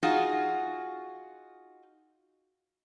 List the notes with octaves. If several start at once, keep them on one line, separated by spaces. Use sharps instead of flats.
D#4 F4 F#4 G#4